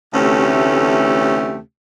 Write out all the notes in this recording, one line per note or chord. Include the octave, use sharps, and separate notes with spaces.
D2 C3 E3 A3 C#4 G4